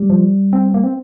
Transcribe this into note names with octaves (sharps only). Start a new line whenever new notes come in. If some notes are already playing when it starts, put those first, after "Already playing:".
Already playing: G3
F3
C4
A#3
C4